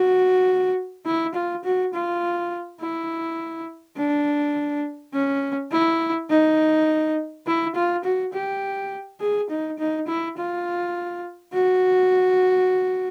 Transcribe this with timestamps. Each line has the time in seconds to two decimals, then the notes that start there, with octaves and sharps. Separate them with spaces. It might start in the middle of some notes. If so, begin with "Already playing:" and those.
Already playing: F#4
1.06 E4
1.35 F4
1.64 F#4
1.93 F4
2.81 E4
3.97 D4
5.13 C#4
5.72 E4
6.30 D#4
7.47 E4
7.75 F4
8.04 F#4
8.33 G4
9.21 G#4
9.50 D#4
9.79 D#4
10.08 E4
10.37 F4
11.53 F#4